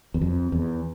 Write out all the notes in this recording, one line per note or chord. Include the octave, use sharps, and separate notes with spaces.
E2
F2
E2